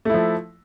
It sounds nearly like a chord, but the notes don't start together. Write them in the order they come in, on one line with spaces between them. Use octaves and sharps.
A3 E4 F3